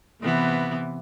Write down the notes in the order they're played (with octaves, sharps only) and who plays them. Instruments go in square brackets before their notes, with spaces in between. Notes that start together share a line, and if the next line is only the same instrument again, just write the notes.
[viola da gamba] C3 E3 B3